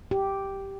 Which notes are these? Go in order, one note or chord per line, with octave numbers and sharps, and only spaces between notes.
G4